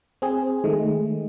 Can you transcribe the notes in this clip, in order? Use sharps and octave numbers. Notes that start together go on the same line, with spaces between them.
C4 G#4
D#3 G#3 A3